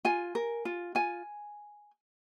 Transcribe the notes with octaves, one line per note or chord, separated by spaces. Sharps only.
F4 G#5
A#4
F4
F4 G#5